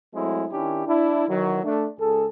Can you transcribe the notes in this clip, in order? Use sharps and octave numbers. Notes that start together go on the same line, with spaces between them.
F#3 G#3 A3 C4 E4
D#3 C#4 D4 E4 G4
D4 E4
D#3 E3 F#3
A3 D4
C#2 G#4 A4